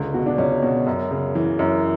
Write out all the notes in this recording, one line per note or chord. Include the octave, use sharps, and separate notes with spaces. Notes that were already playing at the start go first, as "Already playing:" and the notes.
Already playing: C#2 D3
B2 F#4
D4
C#2 C#4
B2
F#2
C#3
E3
F#2